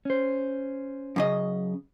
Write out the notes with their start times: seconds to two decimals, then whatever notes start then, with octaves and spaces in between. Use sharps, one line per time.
0.05 C#4 C5
1.16 F#2 C#3 D#5